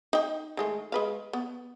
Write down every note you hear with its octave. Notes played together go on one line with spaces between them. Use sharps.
D#4 G5
D#3 G#3 A3
G#3 B4 F5
B3